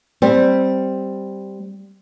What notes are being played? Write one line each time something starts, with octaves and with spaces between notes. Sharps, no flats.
G3 C4